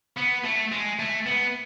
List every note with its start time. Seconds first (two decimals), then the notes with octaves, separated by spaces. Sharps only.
0.17 B3
0.45 A3
0.72 G#3
0.99 A3
1.26 B3